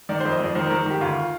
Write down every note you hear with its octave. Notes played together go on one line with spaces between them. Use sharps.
D#3 D5
F2 C5
D#5
F2 D5
D#3 C5
A#4
D#3
A#4
D#3 G4
D2 F4